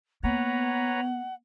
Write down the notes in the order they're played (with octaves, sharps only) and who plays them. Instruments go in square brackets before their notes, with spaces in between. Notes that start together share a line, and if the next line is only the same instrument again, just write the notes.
[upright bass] A#3 [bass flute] B3 [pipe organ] B4 C#5 A#5 [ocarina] F#5